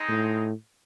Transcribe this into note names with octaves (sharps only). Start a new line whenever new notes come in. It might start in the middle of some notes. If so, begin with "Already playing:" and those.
Already playing: G#3 C4 D#4
A2